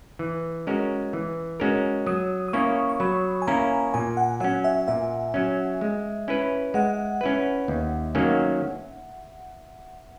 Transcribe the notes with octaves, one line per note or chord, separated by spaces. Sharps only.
E3
G#3 C#4 F#4 A#4
E3
G#3 C#4 F#4 A#4
F#3 D#6
D#6
A#3 C#4 E4 C#6
C#6
F#3 B5
G#5
A#3 C#4 E4 A#5
A#2 G#5
F#5
F#3 C#4 F#5
E5
A#2 E5
F#3 C#4
G#3
C#4 E4 B4
G#3 F#5
C#4 E4 B4
D#2
D#3 F#3 A#3 C#4